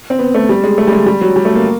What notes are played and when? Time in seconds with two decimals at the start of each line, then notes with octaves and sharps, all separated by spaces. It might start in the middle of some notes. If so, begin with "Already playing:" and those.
0.10 C4
0.19 B3
0.34 A3
0.49 G3
0.64 G#3
0.78 A3
0.87 G3
0.92 G#3
1.07 G3
1.21 F#3
1.36 G3
1.45 A3
1.55 A#3